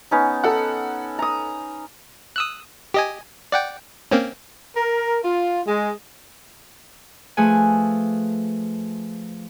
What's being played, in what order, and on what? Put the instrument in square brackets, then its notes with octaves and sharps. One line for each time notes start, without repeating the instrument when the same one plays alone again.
[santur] B3 C#4 D#4
[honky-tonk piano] A4 F#5
[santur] A#5 D#6
[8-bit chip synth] D#6 E6 F#6
G4 D#5 G#5
D5 F#5 G5
A#3 C4 C#4
[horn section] A#4
F4
G#3
[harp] F3 A3 G#4 B4 G#5